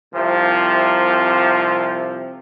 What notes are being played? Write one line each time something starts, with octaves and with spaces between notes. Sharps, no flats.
C2 C3 F3